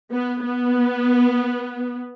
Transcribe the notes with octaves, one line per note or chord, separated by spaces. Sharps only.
B3
B3